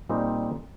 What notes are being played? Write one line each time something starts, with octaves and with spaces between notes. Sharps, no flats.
A#2 G3 C4 D#4